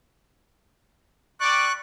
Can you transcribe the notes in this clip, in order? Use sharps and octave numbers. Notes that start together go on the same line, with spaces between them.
G3 D5 C#6 F#6